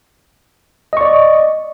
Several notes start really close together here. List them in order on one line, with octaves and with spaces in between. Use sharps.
D#5 C#6 D5